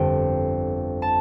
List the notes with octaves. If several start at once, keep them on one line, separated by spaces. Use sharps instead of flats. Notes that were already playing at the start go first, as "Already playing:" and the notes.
Already playing: G1 F2 D3 G3 G5
A5